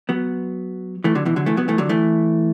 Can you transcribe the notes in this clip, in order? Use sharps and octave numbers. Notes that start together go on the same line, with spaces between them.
F#3 B3
E3 A3
D3 F#3
B2 E3
D3 F#3
E3 A3
F#3 B3
E3 A3
D3 F#3
E3 A3